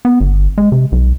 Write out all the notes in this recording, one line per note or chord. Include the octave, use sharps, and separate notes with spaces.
B3
G1
G#3
C3
B1